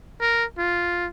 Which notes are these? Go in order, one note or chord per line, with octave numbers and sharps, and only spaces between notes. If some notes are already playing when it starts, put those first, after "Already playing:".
A#4
F4